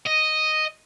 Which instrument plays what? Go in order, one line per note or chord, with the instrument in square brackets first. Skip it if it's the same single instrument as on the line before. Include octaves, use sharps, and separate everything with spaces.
[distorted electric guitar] D#5